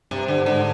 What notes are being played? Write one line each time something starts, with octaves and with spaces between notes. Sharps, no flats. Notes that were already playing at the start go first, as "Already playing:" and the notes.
G2 C3
D3
G#2 D3